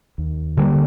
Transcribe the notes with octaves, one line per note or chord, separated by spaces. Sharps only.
D#2
D3 G3 A#3